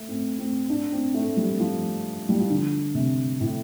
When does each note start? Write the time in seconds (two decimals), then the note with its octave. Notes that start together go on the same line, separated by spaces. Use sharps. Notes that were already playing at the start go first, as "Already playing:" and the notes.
Already playing: A3
0.08 C4
0.38 C4
0.69 D4
0.92 C4
1.14 A3
1.37 G3
1.60 F3
2.29 G3
2.40 F3
2.50 D3
2.94 C3
3.40 A2